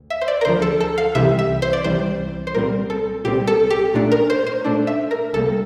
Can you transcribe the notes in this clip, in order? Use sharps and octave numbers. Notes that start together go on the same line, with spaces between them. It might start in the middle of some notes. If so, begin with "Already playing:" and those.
Already playing: D2
E5
C5
D5
A#4
D2 D3 F3 C5
A4
A4
F5
C2 C3 E3 G3 E5
E5
C5
D5
C2 C3 E3 G3 C5
C5
C2 A#2 G3 C4 A#4
A4
C2 A#2 G3 C4 G4
A4
G4
A#2 A3 D4
A#4
C5
C5
A#2 A3 D4
E5
A#4
C2 C3 G3 A#3 A4